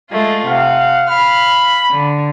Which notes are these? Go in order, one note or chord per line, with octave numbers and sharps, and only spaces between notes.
G#3 A3 F4
C3 F5 F#5
F5 B5 F6
D3